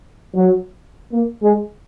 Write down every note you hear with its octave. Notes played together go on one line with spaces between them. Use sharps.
F#3
A#3
G#3